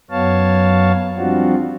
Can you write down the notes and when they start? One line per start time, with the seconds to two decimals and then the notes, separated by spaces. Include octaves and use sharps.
0.11 F#2 F#3 B3 C#5 F5 A5
1.17 F3 G3 C4 D4 F4 F#4